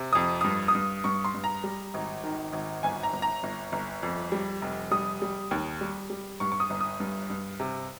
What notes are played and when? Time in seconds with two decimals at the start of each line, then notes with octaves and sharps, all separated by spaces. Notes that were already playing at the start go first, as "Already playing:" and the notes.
Already playing: C3
0.13 F2 D#6
0.41 G2 D#6
0.68 D#6
0.75 G2
1.04 G2 C#6
1.25 C6
1.34 G2
1.44 A#5
1.64 G3
1.94 G#1
2.24 D#3
2.53 G#1
2.83 G1 G#5
3.03 A#5
3.13 G1
3.22 A#5
3.43 G1
3.72 G1
4.03 F2
4.32 G3
4.62 F1
4.91 G3 D#6
5.22 G3
5.51 D#2
5.81 G3
6.10 G3
6.40 G2 C#6
6.52 C#6
6.60 D#6
6.70 G1
6.80 D#6
7.00 G2
7.30 G2
7.60 C3